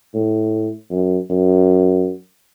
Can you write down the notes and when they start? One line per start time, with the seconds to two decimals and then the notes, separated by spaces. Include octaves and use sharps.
0.14 A2
0.91 F#2
1.30 F#2